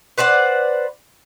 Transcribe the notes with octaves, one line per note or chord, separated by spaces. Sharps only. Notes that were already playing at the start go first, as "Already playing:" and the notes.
B4 C5 D5 F#5